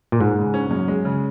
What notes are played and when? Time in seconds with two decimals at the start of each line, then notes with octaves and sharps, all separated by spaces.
0.12 A#2
0.20 G#2 G#3
0.37 C#3
0.54 C#4
0.71 F#2
0.88 G#3
1.05 C#3